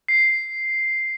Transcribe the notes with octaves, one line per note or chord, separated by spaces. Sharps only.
C7